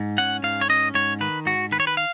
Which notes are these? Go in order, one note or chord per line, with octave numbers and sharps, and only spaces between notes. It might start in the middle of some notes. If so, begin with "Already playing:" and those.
Already playing: G#2
C#4 F#5
G#2 F5
C#5
C#4 D#5
G#2 C#5
D#3 B4
G#2 F#4
D#3 B4
C#5
B4
F5